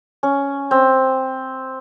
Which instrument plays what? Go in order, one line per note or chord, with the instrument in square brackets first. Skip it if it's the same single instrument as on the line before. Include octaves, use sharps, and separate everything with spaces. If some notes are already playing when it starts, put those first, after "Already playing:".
[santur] C#4
C4